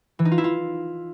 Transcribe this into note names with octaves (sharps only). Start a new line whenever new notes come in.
E3
D#4
F4
E4
F4